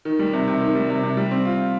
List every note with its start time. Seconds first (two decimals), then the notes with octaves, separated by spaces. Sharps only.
0.05 D#3
0.19 G3
0.33 C3
0.48 C3
0.61 D#3
0.75 G3
0.90 C3
1.03 C3
1.17 G3
1.31 C4
1.45 F4